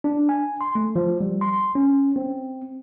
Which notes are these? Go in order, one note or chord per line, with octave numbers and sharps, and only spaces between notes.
D4
G#5
C6
A3
F3
G3
C6
C#4
C4